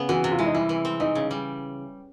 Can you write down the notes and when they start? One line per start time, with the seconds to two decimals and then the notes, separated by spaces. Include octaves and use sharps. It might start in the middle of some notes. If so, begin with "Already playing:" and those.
Already playing: C#3 B3
0.09 E3 F#4
0.24 C3
0.31 F4
0.39 G#3 E4
0.46 D#4
0.54 G3 E4
0.69 E3
0.85 C4
1.00 E3 D#4
1.15 C#3
1.31 G3